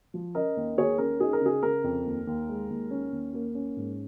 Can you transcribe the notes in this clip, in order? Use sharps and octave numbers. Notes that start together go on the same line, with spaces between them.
F3
C#4 A#4 D#5
D#2
D#2 G#4 C#5
C#4 A#4
D#4 G#4
A#4
C#3 G#4
C#3 A#4
F2
D#2
D#2
G#3
D#2
C#4
D#2
A#3
C#4
G#2